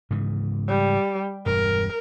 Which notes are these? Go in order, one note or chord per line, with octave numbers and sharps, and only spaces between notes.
G#2 C#3 E3
G3
E1 G2 A#4